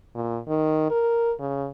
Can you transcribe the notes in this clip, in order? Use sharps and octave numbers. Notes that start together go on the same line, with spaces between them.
A#2
D#3
A#4
C#3